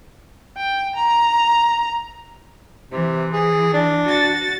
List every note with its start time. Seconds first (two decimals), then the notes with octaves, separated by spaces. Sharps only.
0.57 G5
0.95 A#5
2.92 C3 E3
3.33 G#4
3.73 D4
4.07 F#4 A6